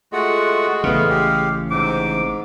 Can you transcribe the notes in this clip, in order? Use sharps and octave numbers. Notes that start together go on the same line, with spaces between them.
G#3 A3 F4 F#4 F#5
A1 C#3 A3 B3 F5
G4
G#2 C3 D6